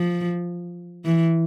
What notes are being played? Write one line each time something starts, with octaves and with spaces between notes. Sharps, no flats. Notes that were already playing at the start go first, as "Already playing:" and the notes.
Already playing: F3
E3